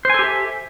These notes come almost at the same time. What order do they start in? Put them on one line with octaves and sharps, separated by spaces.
C5 G#5 A4 G4 E5